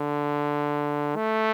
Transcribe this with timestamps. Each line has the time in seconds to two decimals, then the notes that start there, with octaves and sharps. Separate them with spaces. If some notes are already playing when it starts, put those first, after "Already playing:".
Already playing: D3
1.16 A3